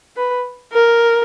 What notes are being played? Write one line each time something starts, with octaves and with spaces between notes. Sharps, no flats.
B4
A#4